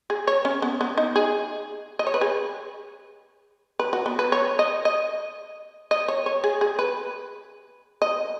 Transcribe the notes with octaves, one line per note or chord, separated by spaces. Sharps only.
G#4
C#5
C#4
B3
B3
D#4
G#4
D#5
C#5
B4
G#4
B4
F#4
B3
B4
C#5
D#5
D#5
D#5
C#5
C#5
G#4
G#4
B4
D#5